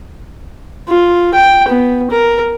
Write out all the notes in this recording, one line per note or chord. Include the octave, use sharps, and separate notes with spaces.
F4
G5
B3
A#4